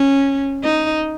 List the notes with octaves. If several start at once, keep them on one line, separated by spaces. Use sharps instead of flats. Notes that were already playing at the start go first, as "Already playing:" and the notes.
Already playing: C#4
D#4